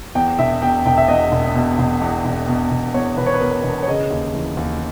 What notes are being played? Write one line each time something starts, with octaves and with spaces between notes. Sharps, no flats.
E2 G5
E1 E5
B2 G5
E1 G5
E5
E2 D#5
E1
B2
E1
E2
E1
B2
E1
E2 C#5
E1 B4
C#5
B4
B2 A#4
E1
C#5
C#3 D#5
D#2
E3
D#2